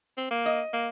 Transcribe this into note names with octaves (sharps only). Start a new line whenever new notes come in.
C4
A#3
D#5
A#3